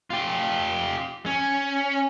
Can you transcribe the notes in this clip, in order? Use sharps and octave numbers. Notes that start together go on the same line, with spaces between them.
F4 G4
C#4